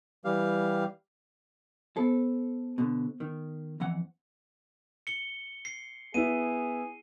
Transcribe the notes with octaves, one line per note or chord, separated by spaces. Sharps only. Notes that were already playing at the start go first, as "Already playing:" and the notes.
E3 G3 G4 F5
B3 A4 C5
B2 D3
D#3
F2 E3 F#5
C#7 G7
C7
B3 E4 G#4 D#7